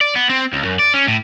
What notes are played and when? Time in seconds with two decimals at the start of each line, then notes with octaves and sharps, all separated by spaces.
0.01 D5
0.16 B3
0.29 C4
0.53 C#2
0.65 F#2
0.79 D5
0.94 C#4
1.08 A2